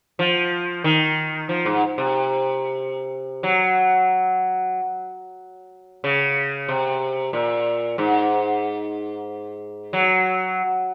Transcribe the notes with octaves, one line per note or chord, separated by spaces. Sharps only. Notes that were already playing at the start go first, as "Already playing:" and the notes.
F3
D#3
F3
G#2
C3
F#3
C#3
C3
A#2
G#2
F#3